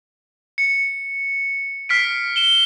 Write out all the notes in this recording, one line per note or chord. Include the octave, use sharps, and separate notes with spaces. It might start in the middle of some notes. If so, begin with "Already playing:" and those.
C#7
F6 B6 C7 D7
E7 G7